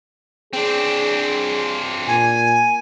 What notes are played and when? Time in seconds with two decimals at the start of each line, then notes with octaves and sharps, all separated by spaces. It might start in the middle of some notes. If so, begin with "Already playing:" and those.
0.53 C4 D4 G#4
2.07 A#2 G#5